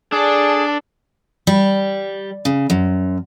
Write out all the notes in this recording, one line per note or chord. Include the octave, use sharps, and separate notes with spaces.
D4 G#4 A4 D5
G3
C#3
F#2